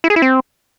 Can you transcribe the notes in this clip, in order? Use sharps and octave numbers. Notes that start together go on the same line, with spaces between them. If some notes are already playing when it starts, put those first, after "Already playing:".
E4
G#4
E4
C4